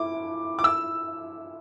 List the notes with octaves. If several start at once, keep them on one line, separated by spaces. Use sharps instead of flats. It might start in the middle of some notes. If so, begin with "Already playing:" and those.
Already playing: E4 D6
D6
E6